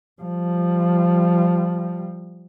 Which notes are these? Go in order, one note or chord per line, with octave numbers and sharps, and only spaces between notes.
F3 G3